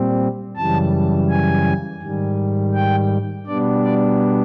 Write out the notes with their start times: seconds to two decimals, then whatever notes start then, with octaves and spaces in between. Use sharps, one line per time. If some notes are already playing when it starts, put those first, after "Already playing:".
Already playing: A#2 G3 C4
0.56 F#2 C#3 E3 G3 A5
1.29 G#5
2.02 G#2 D#3 G3
2.74 G5
3.46 B2 G3 B3 D4 D5
3.83 D5